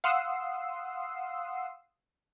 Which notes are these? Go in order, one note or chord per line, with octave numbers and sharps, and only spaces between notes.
F5 F#5 C6 D#6 E6 C7